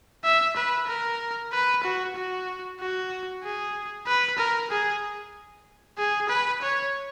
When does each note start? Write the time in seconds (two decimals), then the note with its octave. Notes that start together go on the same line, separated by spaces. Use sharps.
0.25 E5
0.56 B4
0.88 A#4
1.52 B4
1.83 F#4
2.16 F#4
2.80 F#4
3.43 G#4
4.07 B4
4.38 A#4
4.70 G#4
5.98 G#4
6.29 B4
6.62 C#5